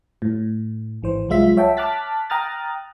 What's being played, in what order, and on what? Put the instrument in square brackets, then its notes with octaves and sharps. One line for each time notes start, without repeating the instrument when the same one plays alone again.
[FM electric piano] A2
G#1 E3 C5
C2 F#3 G#3 F4 E5 B6
C#5 E5 F#5 G5 A5
A5 D6 F6 F#6 A6 B6
G5 A#5 D#6 F6 F#6 A6